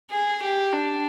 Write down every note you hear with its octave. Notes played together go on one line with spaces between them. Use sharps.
G#4
G4
D4